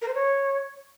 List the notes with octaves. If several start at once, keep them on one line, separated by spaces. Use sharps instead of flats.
A#4
C5
C#5